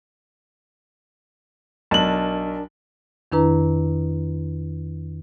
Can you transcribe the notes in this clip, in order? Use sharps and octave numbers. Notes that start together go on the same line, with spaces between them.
B1 D4 A#4 A5 F#7
F2 D#3 D4 E4 B4 A#5